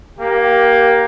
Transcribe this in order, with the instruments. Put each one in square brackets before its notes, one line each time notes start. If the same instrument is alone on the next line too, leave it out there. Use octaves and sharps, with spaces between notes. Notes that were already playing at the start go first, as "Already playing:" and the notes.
[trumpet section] A#3 G4